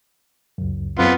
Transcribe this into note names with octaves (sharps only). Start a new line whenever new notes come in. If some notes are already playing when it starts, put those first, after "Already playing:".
C#2 F#2
F#2 B3 C4 F4